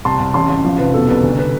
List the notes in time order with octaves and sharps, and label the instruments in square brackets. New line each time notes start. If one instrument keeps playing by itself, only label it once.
[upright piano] C2 A5 C6
C2
A1 A5 C6
A1
F3
F1 B4
B2 A4
C2 B4
D2 B4
B4